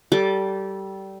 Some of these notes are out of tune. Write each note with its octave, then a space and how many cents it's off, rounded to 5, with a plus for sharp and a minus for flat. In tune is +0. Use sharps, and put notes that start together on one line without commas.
G3 -20 A4 +0 D6 +0